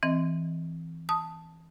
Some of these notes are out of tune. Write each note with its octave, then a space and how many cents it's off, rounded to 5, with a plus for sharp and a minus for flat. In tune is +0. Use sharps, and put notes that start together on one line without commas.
E3 -5 C4 +0 D#5 +0
A5 +0 D#6 +0